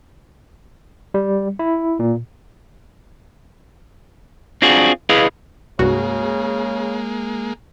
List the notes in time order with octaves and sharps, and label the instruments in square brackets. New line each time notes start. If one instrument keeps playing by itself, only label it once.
[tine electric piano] G3
E4
A#2
[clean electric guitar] C4 D4 F4 F#4 G#4
E4 G#4 B4 D#5 F5
[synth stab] C2 G2 F#4 [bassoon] C#3 [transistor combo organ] G#3 A#3